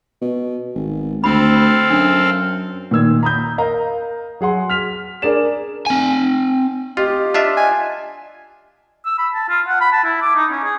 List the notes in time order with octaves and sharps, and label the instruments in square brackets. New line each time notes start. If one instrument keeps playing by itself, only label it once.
[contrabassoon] B2
G#1
[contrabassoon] D2 [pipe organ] C4 A4 F5 [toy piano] B5
[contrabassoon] F#2 [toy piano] D4
[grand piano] A#2 D#3 E6 G#6
A#5 B5 D#6 G6
A#4 D#5 F5 A#5
F#3 G#4 F#5 C6
F6 B6 F7
D4 G#4 A#4 D5 E7
[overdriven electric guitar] C4 G#5
[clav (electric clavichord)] F4 [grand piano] G4 [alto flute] D#5
[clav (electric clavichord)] D4 F4 E5
[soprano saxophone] G#5
[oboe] E6
B5
A5
F4
F#5
B5
A5
E4
D6
D#4
C#4
G#4